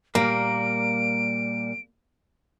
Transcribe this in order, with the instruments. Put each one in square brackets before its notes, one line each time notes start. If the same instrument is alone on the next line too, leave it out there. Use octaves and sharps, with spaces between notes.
[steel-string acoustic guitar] A#2 G3 [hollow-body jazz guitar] A#3 [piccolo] D7